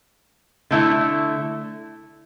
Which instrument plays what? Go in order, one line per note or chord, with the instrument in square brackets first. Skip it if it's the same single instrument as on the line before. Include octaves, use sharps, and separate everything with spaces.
[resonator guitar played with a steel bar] D3 A3 E4